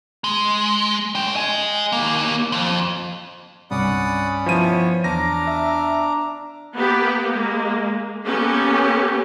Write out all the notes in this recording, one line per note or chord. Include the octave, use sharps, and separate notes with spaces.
G#3
C#4 G5
D#5 G#5
D#2 A#3
F2
C2 G2 C3 C#4 D5 F#5 B5 D#6
F3 B3 E4 C#5 D#7
E2 D4 A#5 D6 F6 A#6
E5
A#3 B3 G4
G#3 A#3
A#3 B3 C#4 G4 A4